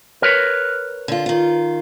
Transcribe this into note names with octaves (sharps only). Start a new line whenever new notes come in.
A#4 B4 C#5
D3 F4
D#3 F4